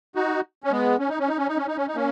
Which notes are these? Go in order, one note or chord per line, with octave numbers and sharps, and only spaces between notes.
D#4 F#4
C#4
G#3 B3
C#4
D#4
C#4
D#4
C#4
D#4
C#4
D#4
C#4
D#4
A#3 C#4